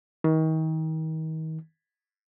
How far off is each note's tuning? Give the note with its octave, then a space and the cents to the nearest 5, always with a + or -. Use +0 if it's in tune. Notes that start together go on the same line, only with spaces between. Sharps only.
D#3 +35